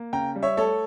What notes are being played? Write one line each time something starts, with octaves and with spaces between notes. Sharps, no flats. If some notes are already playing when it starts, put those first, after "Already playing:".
Already playing: A#3
C#3 G5 A#5
G3
C#5 E5
A3 A4 C#5